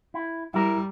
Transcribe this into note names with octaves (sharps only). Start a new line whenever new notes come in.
E4
G3 E4 A#4